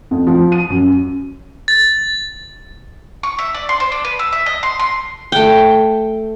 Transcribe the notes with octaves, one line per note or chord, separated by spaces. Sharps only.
F2
F3
D#7
F#2
A6
C#6
E5
D5
C6
C5
D4
B4
E6
E5
D#5
C6
C6
A3 G5